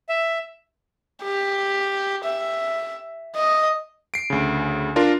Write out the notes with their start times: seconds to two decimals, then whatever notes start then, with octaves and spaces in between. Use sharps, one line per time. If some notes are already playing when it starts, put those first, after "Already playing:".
0.09 E5
1.23 G4
2.24 E5
3.36 D#5
4.14 C7 D7
4.30 D2 C#3
4.96 D4 F4 A#4